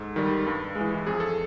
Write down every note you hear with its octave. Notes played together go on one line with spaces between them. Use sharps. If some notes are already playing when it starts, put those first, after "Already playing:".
Already playing: G#2 A4
D#3 G3
G2
G#3
E3
F2 G#4
A4